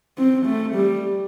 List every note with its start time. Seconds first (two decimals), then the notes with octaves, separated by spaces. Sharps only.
0.18 C4
0.46 A3
0.75 G3